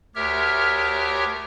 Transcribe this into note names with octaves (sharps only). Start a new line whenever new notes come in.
D2 G4 A#4 C#5 E5 F6